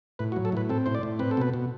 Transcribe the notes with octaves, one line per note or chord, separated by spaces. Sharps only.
A2 B4
F#4
F#3
A4
A2 B4
C4 A4
A2 C5
D5
A2
C4 B4
A4
B2 B4
B2